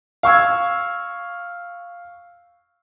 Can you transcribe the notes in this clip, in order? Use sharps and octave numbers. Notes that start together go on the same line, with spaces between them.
F5 C#6 E6 G#6